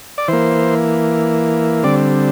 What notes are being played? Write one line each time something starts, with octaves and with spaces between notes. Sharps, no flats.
D5
E3 A#3 C5
D3 G3 C4 D5